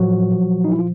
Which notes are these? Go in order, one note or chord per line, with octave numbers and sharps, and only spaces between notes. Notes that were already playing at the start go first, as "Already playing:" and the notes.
Already playing: A2 F3 F#3 F#4
A#2 F3
D#4
E4
F4